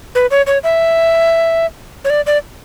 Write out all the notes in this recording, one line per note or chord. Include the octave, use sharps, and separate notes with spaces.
B4
C#5
C#5
E5
C#5
D5
D5